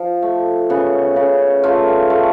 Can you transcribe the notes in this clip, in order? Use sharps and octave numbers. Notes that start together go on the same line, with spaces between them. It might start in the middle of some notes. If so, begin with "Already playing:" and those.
Already playing: F3
A3
C#3 B3
C#3
A3 F4
A3